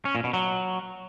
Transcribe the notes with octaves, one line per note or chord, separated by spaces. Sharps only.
C#4
A#2
B2
F#3